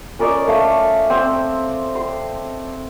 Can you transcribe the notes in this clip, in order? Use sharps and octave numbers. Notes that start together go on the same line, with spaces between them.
C#4 A#4 D5 D#5
A3 F5
C4
C6